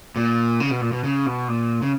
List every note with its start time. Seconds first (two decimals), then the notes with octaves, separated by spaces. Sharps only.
0.16 A#2
0.60 C#3
0.71 B2
0.81 A#2
0.92 B2
1.04 C#3
1.26 B2
1.48 A#2
1.82 C#3